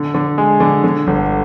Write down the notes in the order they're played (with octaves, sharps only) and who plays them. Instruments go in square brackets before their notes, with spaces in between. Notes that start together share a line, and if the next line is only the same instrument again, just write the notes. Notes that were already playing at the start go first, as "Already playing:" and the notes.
Already playing: [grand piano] D3
D3
G#3
D3
D3
G1